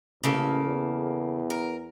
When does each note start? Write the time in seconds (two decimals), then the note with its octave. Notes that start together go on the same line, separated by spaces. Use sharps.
0.24 A1 C#3 A#3 A4
0.66 E2
1.50 A#4